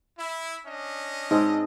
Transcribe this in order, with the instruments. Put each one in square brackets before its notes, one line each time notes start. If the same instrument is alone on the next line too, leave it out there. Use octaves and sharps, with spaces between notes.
[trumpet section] E4
C#4 D4 D#5
[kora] G#2 C4 G#4 [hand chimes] D#4 A5 D#6